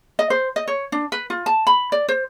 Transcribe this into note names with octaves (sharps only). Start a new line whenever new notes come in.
D#5
C5
D#5
C#5
D4
B4
F4
A5
B5
D5
C5